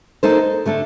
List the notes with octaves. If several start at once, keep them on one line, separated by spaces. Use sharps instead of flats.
A#3 D#4 A4 C5
D3 A3 D4 A4